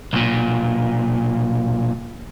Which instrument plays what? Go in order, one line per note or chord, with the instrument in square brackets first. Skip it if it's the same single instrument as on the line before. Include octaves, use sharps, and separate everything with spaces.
[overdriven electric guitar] B1 A#2